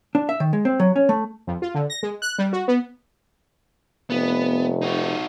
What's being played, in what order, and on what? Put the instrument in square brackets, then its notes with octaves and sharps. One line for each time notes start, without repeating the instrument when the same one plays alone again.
[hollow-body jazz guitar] D4
E5
D#3
G#3
C4
F#3
C#4
A3
[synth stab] F2
F4
D3
A#6
G#3
F#6
G3
F#4
B3
[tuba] F1 [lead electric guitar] B3
[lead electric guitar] D#4 F#4